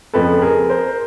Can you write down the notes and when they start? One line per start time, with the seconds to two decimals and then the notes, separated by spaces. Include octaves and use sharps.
0.14 F2 C#3 F3 A4 B4
0.41 G#4 A#4
0.70 A#4 C5